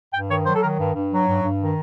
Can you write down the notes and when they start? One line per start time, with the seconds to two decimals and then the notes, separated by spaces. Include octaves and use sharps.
0.14 G2 G5
0.29 D#3 C#5
0.46 F#3 C5
0.55 A4
0.62 D#3 A#4
0.79 G2
0.95 G2
1.12 F#3
1.27 G2
1.43 G2
1.60 D#3